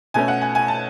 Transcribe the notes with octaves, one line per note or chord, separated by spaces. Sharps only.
B2 A3 C#4 G#5
F#5
G#5
G#5
A5